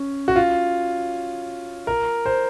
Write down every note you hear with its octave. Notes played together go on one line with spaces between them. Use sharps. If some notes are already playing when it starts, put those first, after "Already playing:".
Already playing: C#4
F#4
F4
A#4
C5